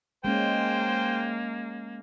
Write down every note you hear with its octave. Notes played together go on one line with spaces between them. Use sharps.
G#3 A#3 C#4 C5 G5